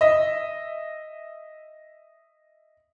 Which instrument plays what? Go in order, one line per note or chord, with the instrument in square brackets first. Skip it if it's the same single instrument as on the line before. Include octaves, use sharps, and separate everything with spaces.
[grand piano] D#5 E5